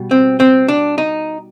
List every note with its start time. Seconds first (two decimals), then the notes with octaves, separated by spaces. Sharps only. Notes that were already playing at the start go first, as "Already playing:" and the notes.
Already playing: B2 G3
0.11 C4
0.40 C4
0.68 D4
0.98 D#4